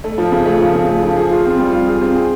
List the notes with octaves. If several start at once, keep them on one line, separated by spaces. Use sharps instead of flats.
A3
F3
C#3
A3
F3
C#3
A3
F3
G#4
F4
C4
G3
F4
G#4
C4
G#4